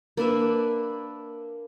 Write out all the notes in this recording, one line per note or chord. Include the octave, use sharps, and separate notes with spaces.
A#3 D4 B4 E5